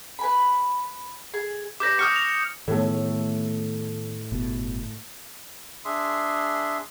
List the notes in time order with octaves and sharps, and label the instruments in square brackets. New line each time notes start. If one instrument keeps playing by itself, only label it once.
[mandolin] B4 G#5 B5
G#4
[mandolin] G4 B4 D5 [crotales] D6 G6 A#6
[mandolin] C#6 G6 [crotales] D#6 F6 C#7
[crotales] F7
[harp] A2 A3 [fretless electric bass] D#3 B3
[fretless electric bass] G1 B2
[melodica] D4 G#4 E5 C6